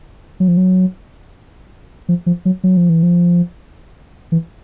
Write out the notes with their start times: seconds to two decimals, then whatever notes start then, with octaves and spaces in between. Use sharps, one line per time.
0.40 F#3
0.48 F3
0.57 F#3
2.09 F3
2.26 F3
2.45 F#3
2.64 F#3
2.77 F3
2.89 E3
3.03 F3
4.32 E3